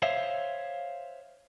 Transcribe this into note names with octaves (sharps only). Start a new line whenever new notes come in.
C5 C#5 E5 F5